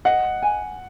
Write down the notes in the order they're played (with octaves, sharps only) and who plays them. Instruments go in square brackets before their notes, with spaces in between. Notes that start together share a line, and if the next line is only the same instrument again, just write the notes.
[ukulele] D#5 [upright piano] F#5
[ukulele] G#5